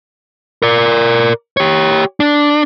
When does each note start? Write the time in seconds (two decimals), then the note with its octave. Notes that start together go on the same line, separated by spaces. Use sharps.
0.62 A#4 D5
1.57 G4 C#5
2.20 D4